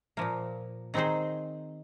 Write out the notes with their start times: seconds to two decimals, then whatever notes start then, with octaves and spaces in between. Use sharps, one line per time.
0.17 A#2 F3 A#3
0.94 D#3 C4 D#4 G#4 C5